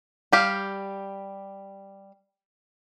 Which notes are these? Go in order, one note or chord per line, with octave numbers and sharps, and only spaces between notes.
G3 G4 F5